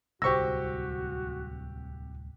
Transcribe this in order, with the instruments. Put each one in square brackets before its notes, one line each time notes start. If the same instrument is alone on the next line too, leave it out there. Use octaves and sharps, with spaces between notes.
[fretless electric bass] D1 C2 [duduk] F#4 [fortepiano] G4 C#6 E6 [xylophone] C5 A#6